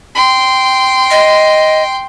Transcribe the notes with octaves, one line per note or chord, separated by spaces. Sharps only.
G5 C6
D#5